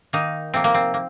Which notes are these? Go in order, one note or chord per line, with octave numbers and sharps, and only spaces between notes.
D#3 A#3 D#4
C3 F3 A#3 C4
A#3
C4
A#3